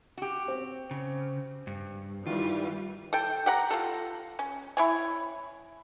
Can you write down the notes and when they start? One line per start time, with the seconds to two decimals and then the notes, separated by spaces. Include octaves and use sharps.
0.18 F#4 G4
0.48 C4
0.91 C#3
1.67 G2
2.27 D#3 E3 G3 F4
3.13 A4 G5
3.46 G4 F#5 A#5
3.70 F4 A4
4.39 C#4
4.77 E4 C#5 G#5